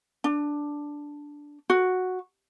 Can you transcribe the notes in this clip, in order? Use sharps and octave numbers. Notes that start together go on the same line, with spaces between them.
D4
F#4